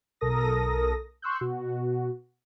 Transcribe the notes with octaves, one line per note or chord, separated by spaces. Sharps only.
B1 A4 A#4 D#6 A#6
C6 C#6 E6 F#6 G6
B2 F#4